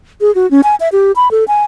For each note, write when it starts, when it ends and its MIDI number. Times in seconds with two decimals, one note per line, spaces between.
0.21 0.34 68
0.35 0.49 66
0.51 0.61 61
0.64 0.75 80
0.80 0.89 76
0.92 1.12 67
1.16 1.31 83
1.31 1.44 69
1.48 1.64 80